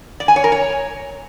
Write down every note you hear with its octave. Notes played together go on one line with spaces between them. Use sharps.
D5
G#5
C#5
A#4
C#5